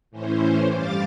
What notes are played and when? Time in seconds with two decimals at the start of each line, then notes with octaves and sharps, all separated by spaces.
0.11 A2 E3 C#4 C5
0.70 G2 G3 F5 D6 A6